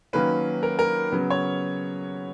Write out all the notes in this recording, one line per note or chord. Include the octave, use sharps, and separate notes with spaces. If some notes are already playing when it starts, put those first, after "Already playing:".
D#3 F#3 A#3 C#4 B4
A#4
A#4
C#3 F#3 B3
C#5